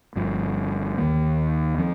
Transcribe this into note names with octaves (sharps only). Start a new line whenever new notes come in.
G1 G2 F3
D#2 D#3 A#3
F3 C4